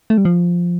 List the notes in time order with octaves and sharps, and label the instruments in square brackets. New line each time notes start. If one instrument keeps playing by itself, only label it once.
[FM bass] A3
G3
F3